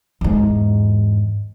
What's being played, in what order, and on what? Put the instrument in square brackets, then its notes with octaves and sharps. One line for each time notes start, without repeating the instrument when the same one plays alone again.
[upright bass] E2 G#2